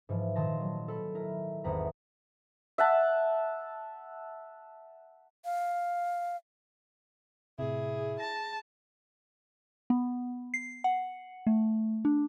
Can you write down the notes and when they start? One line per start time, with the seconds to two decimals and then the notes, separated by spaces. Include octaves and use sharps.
0.09 G#2 E3 F3
0.36 A#2 D#3 A5 C6 A#6
0.60 F#3
0.88 A4 B5
1.14 E4 A#4
1.64 G#1 E2 F#5 A#5 B6
2.78 E5 F#5 A5
5.45 F5
7.59 A2 C3 E4 G#4
8.20 A5 A#6
9.90 B3
10.54 C7
10.84 F#5
11.47 A3
12.05 D4